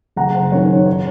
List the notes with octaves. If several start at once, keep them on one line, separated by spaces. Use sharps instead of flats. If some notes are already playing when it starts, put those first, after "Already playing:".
F#1 F#5 A#5
C5
F#2 D#3 C#5
C#5